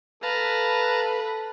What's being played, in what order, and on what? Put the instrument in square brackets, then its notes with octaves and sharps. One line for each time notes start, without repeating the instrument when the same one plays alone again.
[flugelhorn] A4 [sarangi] B4 [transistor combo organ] F5 A5 A#5